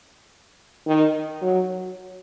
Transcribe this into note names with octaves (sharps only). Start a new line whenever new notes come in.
D#3
F#3